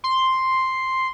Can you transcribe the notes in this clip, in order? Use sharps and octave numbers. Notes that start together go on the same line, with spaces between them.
C6